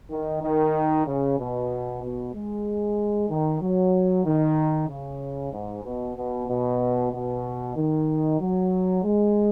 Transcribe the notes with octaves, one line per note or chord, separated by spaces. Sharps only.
D#3
D#3
C#3
B2
B2
G#3
D#3
F#3
D#3
C#3
G#2
B2
B2
B2
B2
D#3
F#3
G#3